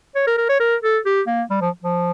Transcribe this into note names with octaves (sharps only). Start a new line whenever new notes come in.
C#5
A#4
A#4
C#5
A#4
A4
G4
A#3
G3
F3
F3